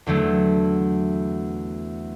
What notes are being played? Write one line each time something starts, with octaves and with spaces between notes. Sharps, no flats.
E2 D3 F#3 A3